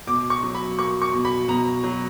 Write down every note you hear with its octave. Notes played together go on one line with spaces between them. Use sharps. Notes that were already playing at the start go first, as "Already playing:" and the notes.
B2 D6
C#6
F#3
B5
A#3 C#6
C#6
B2
B5
B2 A#5
F#3